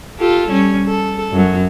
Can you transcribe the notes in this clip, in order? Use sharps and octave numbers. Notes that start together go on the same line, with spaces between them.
F4 G4 A4
G3 C#4
A4
F#2 F#3